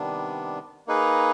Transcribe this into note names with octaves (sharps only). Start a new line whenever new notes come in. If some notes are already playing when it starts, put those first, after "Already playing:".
Already playing: C3 D#3 G3 B3 D4
A#3 D#4 G#4 B4